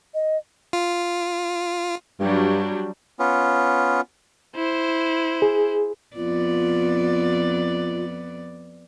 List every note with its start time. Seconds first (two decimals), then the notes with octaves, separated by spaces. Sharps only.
0.14 D#5
0.73 F4
2.19 G2 F#3 G3 D4
3.19 B3 C#4 F4
4.56 E4 C5
5.42 G#4
6.16 F2 B3 F4 D5